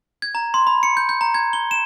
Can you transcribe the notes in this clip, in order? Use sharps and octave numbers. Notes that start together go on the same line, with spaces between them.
G#6
A#5
C6
B5
C#7
G6
G6
A#5
G#6
G7
E7